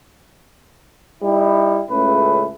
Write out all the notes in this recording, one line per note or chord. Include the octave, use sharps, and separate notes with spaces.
G3 D#4 E4
C#2 A2 C#3 A3 B4